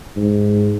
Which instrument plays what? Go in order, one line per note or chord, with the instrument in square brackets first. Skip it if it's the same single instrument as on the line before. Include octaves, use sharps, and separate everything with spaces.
[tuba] G#2